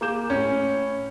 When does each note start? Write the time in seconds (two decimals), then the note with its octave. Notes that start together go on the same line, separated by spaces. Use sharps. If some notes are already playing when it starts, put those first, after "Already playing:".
0.01 A#3 G#4 D6 G6 E7
0.30 A2 C#4